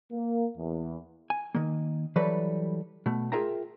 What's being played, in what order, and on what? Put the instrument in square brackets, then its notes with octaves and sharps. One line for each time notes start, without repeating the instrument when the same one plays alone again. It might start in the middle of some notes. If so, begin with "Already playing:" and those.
[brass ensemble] A#3
E2
[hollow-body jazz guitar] G#5
D#3 A#3
E3 F#3 G3 A4 B4
B2 A3
F4 G#4 A#4 E5 G5 A#5